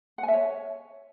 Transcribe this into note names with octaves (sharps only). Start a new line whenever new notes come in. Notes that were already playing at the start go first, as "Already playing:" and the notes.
F#5
G#5
E5
C#5